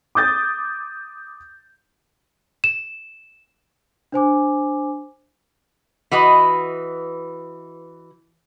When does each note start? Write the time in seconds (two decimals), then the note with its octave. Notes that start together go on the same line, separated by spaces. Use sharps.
0.15 D6 D#6 G6 A6
2.64 E7
4.12 D4 C5 G#5 D6
6.11 E3 F#4 B4 D#5